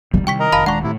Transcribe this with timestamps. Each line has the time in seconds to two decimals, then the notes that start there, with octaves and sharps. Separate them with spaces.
0.14 D#3 G3 D#4
0.27 C3 G3 G5 C#6 B6
0.40 A#4 D#5 A#5
0.52 F1 F5 A5 B5
0.66 D#1 G#3 D4 F#5 A#5 C#6
0.83 A2 C3 A3 E4